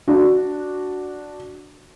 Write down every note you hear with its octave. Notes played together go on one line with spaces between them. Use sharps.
D4 F#4